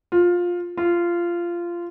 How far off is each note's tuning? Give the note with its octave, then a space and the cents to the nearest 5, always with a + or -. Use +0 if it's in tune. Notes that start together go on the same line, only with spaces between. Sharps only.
F4 +15
F4 -15